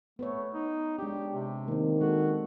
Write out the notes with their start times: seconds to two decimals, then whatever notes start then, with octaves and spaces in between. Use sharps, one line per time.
0.19 A3 B3 B4 C#5
0.54 D#4
0.99 G#3 D4 G4
1.33 C3
1.68 D#3 A#3 C4
2.01 G#3 F#4 A4